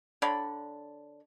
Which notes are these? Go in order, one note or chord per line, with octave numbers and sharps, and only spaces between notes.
D3 C#5 D5 B5